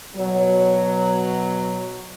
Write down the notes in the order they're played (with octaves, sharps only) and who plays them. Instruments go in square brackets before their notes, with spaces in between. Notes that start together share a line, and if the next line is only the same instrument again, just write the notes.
[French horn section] B2 F#3